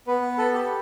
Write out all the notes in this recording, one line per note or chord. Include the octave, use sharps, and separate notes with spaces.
B3 B4
A4
G4